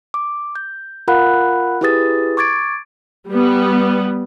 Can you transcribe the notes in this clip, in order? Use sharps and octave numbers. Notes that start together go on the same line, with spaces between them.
D6
G6
F4 A#4 F5 F#5 B5 F#6
E4 G4 G#4 B4 D#6 A6
C#6 D6 G#6 A6 D7
G3 B3